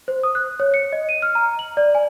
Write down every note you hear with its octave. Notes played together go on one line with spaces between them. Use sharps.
C5
D#6
F#6
C#5
C#7
D#5
D#7
F6
A#5
F#7
D5
G#5